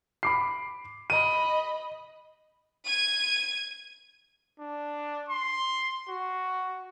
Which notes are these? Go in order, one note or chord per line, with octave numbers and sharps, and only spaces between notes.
B5 D6 C7
D#5 B5 D#7
G#6 D#7
D4
C6
F#4